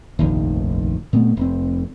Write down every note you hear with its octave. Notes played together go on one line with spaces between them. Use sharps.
F1 A#1 D#2 D#3
A#2 A3 B3 C4
F1 C4